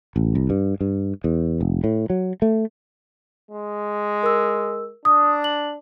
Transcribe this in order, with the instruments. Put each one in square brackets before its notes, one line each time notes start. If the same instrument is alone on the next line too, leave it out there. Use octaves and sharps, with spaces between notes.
[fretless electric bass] A1
C2
G2
G2
E2
F1
A2
F#3
A3
[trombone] G#3
[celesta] A#4 E6
[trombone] D4 [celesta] D#6
[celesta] F#7